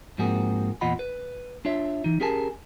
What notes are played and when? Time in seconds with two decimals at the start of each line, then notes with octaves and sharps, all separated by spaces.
0.18 G#2 F3 A#3 C4 F#4 G#4
0.81 E2 A#2 F4 D#5 F#5 B5
0.99 B4
1.65 D4 F4 C#5 E5
2.04 E3 D#4
2.20 C#4 G4 G#4 A#4 G#5 A5